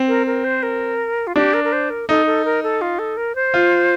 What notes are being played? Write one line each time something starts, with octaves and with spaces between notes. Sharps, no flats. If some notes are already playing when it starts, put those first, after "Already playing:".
Already playing: C4
A#4
A#4
C5
A#4
F4
D4 G4
A#4
A#4
C5
A#4
D#4 A4
A4
A#4
A4
F4
A4
A#4
C5
F4